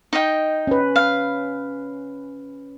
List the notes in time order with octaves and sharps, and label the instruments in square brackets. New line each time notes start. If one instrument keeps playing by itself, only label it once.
[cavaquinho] D#4 D#5 G5
[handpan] C#4 B4
[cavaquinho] F5